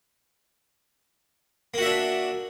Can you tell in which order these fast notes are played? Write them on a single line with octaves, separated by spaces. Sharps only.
A#3 F#4 E5 D4